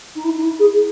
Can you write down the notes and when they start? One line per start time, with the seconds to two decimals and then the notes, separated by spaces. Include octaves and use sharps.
0.15 D#4
0.24 E4
0.37 D#4
0.42 E4
0.59 G#4